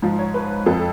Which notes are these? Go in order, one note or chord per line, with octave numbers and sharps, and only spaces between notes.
G#2 F3
C#5
B4
F2 F3 A4